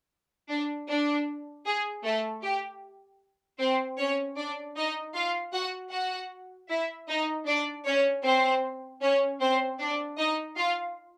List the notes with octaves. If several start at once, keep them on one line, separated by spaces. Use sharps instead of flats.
D4
D4
G#4
A3 A4
G4
C4 C5
C#4 C#5
D4 D5
D#4 D#5
F4 F5
F#4 F#5
F#4 F#5
E4 E5
D#4 D#5
D4 D5
C#4 C#5
C4 C5
C#4 C#5
C4 C5
D4 D5
D#4 D#5
F4 F5